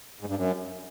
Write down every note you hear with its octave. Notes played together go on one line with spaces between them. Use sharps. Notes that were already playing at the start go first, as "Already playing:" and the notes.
G#2
G2
F#2